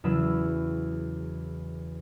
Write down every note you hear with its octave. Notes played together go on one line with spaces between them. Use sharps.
E2 C#3 F#3 C#4 B5 E6